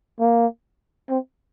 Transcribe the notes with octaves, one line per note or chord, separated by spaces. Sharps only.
A#3
C4